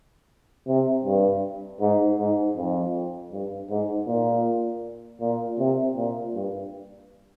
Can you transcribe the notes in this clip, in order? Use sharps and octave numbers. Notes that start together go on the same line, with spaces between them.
C3
G2
G#2
G#2
F2
G2
G#2
A#2
A#2
C3
A#2
G2